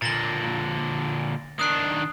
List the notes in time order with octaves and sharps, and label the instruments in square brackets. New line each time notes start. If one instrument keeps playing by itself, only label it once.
[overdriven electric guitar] A#2 D3 [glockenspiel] A6 A#6 G7
[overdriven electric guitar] D#3 D4 [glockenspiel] D#6 F#6 C7